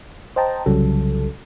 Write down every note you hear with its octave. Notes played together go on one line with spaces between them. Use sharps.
C5 D#5 G5 A5 A#5
C2 C#3 F#3 G3 A4